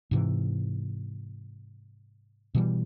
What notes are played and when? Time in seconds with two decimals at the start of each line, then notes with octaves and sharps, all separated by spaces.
0.11 G#2 C3 E3
2.55 B2 E3 G3